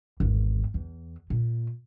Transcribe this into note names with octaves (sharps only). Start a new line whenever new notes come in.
G#1 E2
E2
A#2